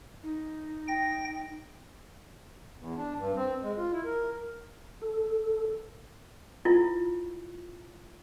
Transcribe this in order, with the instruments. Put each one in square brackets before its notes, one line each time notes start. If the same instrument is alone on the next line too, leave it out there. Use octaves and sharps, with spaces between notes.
[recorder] D#4
[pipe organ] G5 A#6
[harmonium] E2
D4
G2
C4
G#3
F4
E4
A#4
[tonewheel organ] A4
[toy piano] E4 F4